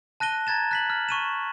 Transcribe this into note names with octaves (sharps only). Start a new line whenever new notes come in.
A5 F#6 A#6 D#7 G7
A#5 G#6 A6 E7
F#6 B6 F#7
F6
C#6 D#7 E7